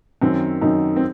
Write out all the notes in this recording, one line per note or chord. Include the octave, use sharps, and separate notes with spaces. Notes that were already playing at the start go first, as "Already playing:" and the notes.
F#2 D#3 C4
F#2 D#3 D#4
C4